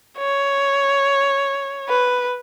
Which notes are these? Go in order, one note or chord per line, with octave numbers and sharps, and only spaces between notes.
C#5
B4